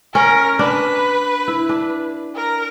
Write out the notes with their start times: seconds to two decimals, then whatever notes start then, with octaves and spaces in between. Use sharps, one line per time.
0.14 C#4 A#4
0.59 D4 B4
1.48 E4
1.69 D4
2.36 A#4